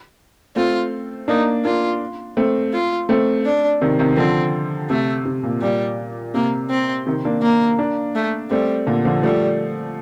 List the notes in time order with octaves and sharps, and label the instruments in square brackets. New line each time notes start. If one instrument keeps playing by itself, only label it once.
[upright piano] A3 C4 [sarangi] F4
[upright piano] A#3 D4 [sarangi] D#4
[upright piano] A#3 D4 [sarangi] F4
[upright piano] A3 C4
[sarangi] F4
[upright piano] A3 C4
[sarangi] D4
[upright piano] C3 D#3
C3 D#3
[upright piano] D3 F3 [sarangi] C4
[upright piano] C3 [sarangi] A3
[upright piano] C3
A#2
[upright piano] A#2 [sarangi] G3
[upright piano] C3 [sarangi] A#3
[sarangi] C4
[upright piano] C3 D#3
A#3 D4
[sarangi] A#3
[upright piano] A#3 D4
[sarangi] A3
[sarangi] G3 [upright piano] A3 C4
[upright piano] A#2 D3
D3 F3
[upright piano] F3 A3 [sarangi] G3